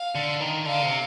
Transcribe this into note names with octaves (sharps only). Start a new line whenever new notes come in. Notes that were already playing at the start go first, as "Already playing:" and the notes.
Already playing: F5
D3
D#3
D3 F5
C3